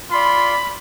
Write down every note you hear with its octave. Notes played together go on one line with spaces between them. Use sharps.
F4 D5 B5 C6